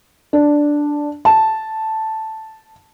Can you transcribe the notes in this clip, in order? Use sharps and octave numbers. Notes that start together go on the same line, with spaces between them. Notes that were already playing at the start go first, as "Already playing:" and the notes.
D4
A5